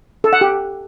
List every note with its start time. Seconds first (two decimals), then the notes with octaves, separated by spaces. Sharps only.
0.24 A4
0.33 F#5
0.41 G4